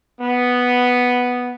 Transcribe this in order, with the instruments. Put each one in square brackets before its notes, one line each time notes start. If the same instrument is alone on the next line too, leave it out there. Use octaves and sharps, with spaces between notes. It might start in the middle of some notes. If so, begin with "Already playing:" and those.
[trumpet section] B3